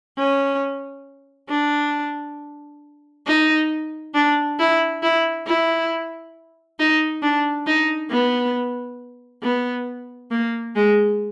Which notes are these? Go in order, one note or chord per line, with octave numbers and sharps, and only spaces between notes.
C#4
D4
D#4
D4
E4
E4
E4
D#4
D4
D#4
B3
B3
A#3
G#3